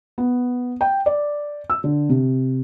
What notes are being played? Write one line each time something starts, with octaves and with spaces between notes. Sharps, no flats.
B3
G5
D5
E6
D3
C3